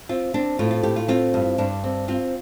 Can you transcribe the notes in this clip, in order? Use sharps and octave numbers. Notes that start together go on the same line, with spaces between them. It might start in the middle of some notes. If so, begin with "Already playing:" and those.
C4 F4
C4 D4
A2 F4
F4
A2 G4
F4
C4 F4
G2
G2 D4
C4
C4 F4